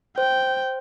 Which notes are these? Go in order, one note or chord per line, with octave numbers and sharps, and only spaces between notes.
C5 G5